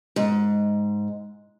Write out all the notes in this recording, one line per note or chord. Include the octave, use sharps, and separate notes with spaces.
G#2